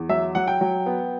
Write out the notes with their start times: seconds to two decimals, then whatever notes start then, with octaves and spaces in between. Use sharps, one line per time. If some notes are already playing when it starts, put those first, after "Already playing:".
Already playing: E2
0.09 F#3 E5
0.35 F#3 F#5
0.48 G5
0.61 F#3
0.86 B3